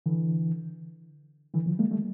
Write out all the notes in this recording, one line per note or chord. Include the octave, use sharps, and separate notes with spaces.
D3 E3
D3 E3
D#3 F3
G#3 A#3
G3 A3